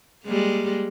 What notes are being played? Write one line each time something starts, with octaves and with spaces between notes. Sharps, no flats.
G3 G#3 A#3